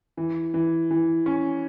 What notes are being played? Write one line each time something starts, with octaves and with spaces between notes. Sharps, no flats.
E3
E3
E3
C#4